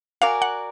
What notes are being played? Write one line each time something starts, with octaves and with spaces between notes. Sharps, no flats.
F#4 A#4 D5 F5 G#5
F#5